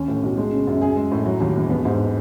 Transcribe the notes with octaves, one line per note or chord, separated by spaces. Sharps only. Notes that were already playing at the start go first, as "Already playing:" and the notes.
Already playing: D#2 C#4
A2
B1
G#3
C#3
F#2
G#4
G#3
A2
F#3
D#2
E1
B3
G#2